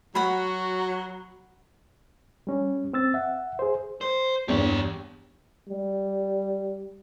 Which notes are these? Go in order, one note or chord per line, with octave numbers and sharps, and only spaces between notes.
F#3 F#4 F#5 B5
G3 C#4
C4 E6 A6
E5 F#5
G#4 C5
C5
E2 G2 B3 G4 C#5
G3